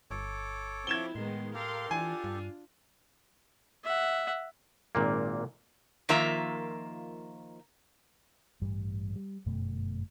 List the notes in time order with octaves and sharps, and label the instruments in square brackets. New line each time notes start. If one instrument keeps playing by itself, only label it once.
[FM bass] G1 [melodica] A4 C#5 D6
[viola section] F3 C4 E4 [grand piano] G#6 E7 G7
[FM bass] A2 [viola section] D#3 G#3 B3 [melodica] C6
[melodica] G4 A4 [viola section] A#4 F5 C6
[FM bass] E3 [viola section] D4 F4 [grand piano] G#5
[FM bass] G2
[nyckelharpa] E5 F#5
[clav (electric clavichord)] G#1 A#2 A#3
[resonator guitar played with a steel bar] D#3 F3 A#3 F4 E5 A#5
[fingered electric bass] A1 G2 G3
G3
G1 F#2 B2 A3